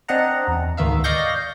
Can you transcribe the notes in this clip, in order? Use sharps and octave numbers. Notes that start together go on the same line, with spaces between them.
C4 D4 D#5 F#5 A#5
E2
D2 G#2 D#3 B3 E5 F5
D5 D#5 F5 C#6 G6 A#6